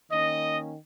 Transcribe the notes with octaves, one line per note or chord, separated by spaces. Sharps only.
D#3 A#3 C#4 D#5